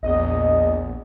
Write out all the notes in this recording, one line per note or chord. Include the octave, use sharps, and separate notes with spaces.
A#1 E2 D#5